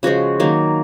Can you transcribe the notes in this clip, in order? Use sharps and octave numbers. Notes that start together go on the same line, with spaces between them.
C#3 F3 G#3 F#4
D#3 F#3 A#3